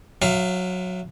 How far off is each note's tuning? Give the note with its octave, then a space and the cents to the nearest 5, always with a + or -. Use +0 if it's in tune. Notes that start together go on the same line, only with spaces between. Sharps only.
F#3 -15 E4 +25 F5 +0